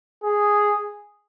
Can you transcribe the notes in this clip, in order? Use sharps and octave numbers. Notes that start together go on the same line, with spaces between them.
G#4